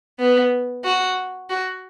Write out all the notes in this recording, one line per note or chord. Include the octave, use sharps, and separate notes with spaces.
B3
F#4
F#4